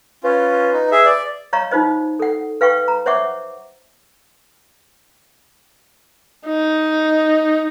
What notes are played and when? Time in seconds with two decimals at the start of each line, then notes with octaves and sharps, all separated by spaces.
0.24 C#4 F4 B4
0.72 D#4
0.92 G#4 E5
1.06 D5
1.53 C#5 D#5 F5 A#5 C#6
1.71 D#4 F4 C5 D#5
2.20 A4 F#5
2.61 B4 F5 G5 C#6
2.88 A#5
3.06 C5 C#5 E5 F#5 C#6 D6
6.46 D#4